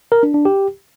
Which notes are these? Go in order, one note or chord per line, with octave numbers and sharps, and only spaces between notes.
A#4
D4
D4
G4